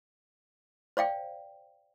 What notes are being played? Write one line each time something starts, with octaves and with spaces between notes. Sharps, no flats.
C5 D5 F5 G5